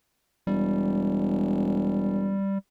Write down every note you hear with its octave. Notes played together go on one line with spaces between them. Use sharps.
E1 G3